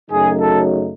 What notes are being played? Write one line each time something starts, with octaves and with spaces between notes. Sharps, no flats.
F#2 C#3 F#3 A3 D#4 G#4
A4